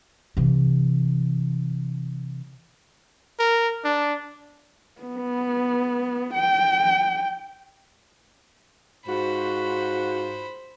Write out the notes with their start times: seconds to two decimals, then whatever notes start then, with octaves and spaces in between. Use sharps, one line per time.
0.37 C3 E3
3.39 A#4
3.84 D4
5.02 B3
6.34 G5
9.07 G#2 F4 F#4 C5 B5